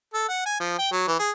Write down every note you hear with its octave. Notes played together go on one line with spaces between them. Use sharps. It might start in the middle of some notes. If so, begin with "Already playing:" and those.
A4
F#5
G#5
F3
G5
F#3
E3
G#4